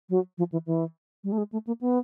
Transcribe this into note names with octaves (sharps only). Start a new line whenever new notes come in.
F#3
F3
E3
E3
G3
A3
G#3
A3
A#3
B3